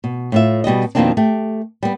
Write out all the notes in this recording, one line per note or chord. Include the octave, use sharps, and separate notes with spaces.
B2
A2 F4 E5
B2 G3 F#4 D#5
F2 B2 D#3 A#3 C4 D4
A3 G4
G3 B3